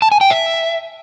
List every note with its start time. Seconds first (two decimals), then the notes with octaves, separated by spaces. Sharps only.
0.02 A5
0.12 G#5
0.21 G5
0.30 E5